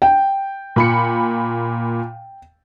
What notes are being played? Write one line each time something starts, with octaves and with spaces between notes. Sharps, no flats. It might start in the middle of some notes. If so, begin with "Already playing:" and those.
G5
A#2 B5 C#7